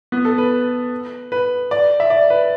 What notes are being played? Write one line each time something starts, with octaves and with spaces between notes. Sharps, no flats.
B3
A4
B4
B4
D5
E5
D5
B4